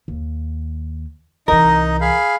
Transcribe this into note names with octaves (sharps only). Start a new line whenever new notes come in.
D#2
C2 E3 D#4 A#4 D#5
G#4 F5 B5